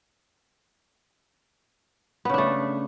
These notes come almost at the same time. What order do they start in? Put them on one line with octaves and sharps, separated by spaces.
B3 C#3 D4 A3